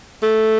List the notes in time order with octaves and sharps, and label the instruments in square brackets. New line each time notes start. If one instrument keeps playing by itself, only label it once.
[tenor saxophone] A3